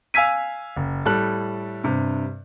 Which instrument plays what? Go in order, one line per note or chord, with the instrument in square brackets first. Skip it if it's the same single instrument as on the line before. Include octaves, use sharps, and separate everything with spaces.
[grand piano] F5 G#5 E6 G#6 B6 D#7
F#1
A2 G3 A4 F#6
G2 C3